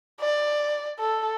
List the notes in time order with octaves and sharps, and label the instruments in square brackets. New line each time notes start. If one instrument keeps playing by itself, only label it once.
[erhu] D5
A4